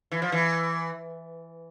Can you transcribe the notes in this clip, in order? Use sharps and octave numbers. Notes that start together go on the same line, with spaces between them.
E3
F3
E3